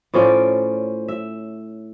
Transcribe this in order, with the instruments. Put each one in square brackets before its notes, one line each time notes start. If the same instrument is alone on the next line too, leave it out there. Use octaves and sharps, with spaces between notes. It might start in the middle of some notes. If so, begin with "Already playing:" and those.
[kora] A2 F3 C#4 D5
E5